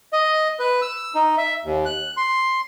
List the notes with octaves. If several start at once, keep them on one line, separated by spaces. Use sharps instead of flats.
D#5
B4
E6
D#4
E5
D#2
F#6
C6